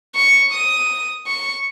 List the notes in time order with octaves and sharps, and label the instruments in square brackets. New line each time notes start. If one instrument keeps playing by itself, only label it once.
[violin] C#6
D#6
C#6